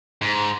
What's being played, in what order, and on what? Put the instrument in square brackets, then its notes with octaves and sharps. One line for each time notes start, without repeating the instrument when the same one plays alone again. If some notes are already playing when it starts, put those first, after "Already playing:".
[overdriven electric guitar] G#2